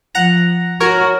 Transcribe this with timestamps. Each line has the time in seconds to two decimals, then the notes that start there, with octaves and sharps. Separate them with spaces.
0.15 F3 F#5 A#5
0.80 F#4 A#4 C#5